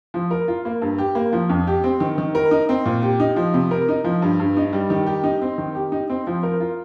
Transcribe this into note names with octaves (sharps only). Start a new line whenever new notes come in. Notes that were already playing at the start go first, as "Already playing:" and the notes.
F3
A#4
F4
A#3
G2
G4
A#3
F3
F2
G4
C4
D#3
D#3
A#4
D#4
C4
A#2
G4
D#4
F3
C3
A#4
D#4
F3
G2
G2
D#4
G3
D#3
G4
D#4
C4
D#3
G4
D#4
C4
F3
A#4
F4